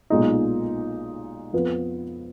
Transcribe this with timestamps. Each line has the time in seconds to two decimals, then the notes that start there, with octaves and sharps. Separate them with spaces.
0.10 B1 A#2 G#3 D#4
1.53 F2 F3 B3 F4 B4